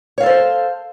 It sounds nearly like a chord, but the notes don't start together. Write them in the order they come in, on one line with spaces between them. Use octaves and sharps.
C#5 F5 A4 C5